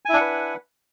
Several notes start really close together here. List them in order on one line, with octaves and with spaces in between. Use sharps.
G#5 E4 D4 F#5 B4